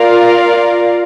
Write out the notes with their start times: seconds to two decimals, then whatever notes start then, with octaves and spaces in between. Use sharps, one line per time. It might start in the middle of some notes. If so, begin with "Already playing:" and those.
Already playing: F4 A#4 D5 F5